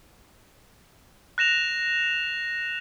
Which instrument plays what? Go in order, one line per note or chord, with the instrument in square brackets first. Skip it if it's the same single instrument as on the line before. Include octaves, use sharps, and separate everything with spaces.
[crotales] F#6 A#6 E7 F7